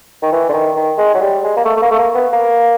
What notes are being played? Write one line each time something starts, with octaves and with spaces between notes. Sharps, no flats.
D#3
E3
D3
D#3
D#3
G#3
F#3
G3
G#3
A#3
A3
A3
A#3
A3
A#3
B3
A#3